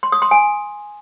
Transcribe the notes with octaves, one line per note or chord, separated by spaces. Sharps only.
C6
D#6
C6
G#5